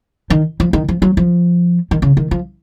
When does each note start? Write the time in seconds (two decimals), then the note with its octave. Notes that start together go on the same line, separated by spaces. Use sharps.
0.30 D#3
0.60 F3
0.73 D#3
0.88 F3
1.02 F#3
1.17 F3
1.91 D#3
2.02 C#3
2.17 D#3
2.31 F3